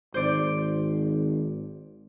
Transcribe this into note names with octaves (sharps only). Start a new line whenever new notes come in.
G#1 C5 D5 C6